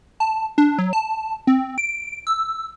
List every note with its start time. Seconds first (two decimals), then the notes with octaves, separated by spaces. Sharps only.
0.20 A5
0.58 D4
0.78 F#3
0.93 A5
1.47 C4
1.78 D7
2.27 E6